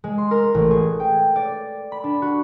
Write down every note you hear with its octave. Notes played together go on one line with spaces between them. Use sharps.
G#3
C6
A#4
A1
G#4
G5
D5
B5
D4
F#4